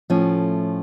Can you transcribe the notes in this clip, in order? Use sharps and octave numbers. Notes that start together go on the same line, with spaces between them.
A2 F3 A3 C#4